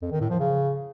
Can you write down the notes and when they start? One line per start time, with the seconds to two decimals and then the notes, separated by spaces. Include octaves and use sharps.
0.02 F2
0.11 D#3
0.21 A2
0.30 F3
0.39 C#3